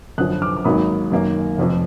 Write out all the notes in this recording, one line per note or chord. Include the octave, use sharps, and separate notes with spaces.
F#2 D3 F3 D#6 F#6
D6 F6
D6
G#1 G#2 F#3 A#3 B5 D#6
F#2 D#3 A#3
F1 F2 F3